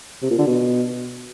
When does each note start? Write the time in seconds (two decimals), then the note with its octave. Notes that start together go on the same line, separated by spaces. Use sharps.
0.22 C3
0.31 A#2
0.39 D3
0.47 B2